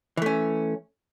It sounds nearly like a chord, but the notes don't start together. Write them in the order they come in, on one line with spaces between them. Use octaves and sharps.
E3 A3 C#4